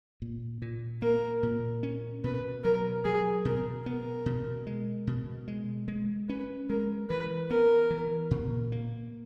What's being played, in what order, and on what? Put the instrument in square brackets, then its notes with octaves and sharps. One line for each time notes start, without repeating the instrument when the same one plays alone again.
[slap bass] A#2
A#2
[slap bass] A#3 [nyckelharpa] A#4
[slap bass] A#2
C#4
[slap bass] B2 [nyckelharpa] B4
[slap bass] F#3 [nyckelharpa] A#4
[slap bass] F#3 [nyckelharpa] G#4
[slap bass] B2 [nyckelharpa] A#4
[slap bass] B3 [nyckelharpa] A#4
[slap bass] B2
G#3
B2
G#3
G#3
[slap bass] C#4 [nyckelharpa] B4
[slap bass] G#3 [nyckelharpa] A#4
[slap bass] E3 [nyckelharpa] B4
[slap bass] B3 [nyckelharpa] A#4
[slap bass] E3
A#2
A#3